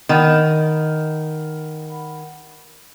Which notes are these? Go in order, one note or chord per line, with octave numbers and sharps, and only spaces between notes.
D#3 F#5 B5